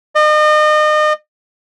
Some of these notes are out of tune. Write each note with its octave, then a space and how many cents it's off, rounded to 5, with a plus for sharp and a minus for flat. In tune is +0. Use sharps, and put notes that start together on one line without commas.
D#5 -35